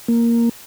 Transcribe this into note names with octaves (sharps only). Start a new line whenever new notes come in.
A#3